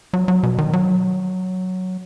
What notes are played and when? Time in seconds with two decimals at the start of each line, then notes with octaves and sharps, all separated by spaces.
0.13 F#3
0.28 F#3
0.43 B2
0.58 D#3
0.73 F#3